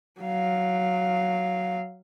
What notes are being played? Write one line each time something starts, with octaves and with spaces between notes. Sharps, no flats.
F#3 F5